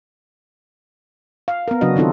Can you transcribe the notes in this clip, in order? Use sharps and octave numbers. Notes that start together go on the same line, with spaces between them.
F5
B3 A#4
C#3 F#3 D4 F#4 D#5
D#3 C4 D#4 F4 A4